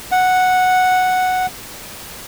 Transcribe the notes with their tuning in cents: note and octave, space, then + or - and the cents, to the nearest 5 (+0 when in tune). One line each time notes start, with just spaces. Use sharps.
F#5 -5